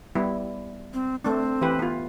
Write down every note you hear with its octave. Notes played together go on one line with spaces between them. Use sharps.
G3 B3 E4
C4
A3 C4 D4
E3 G4 B4
B3 F4